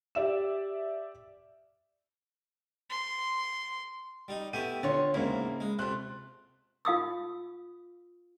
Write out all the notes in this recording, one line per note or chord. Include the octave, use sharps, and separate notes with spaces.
G4 D5 E5 E7
C6
G3 D#4
A3 B3 E4 G4 D#7
D3 F4 C#5
E2 G#2 C#3 A#3 E4
G#3
C3 A3 F4 F#6
F4 F5 D#6 E6